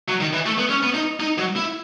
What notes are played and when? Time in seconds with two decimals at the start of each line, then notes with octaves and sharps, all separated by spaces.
0.08 F#3
0.21 D#3
0.33 E3
0.46 A3
0.58 B3
0.70 C#4
0.83 B3
0.94 D#4
1.20 D#4
1.38 F#3
1.56 E4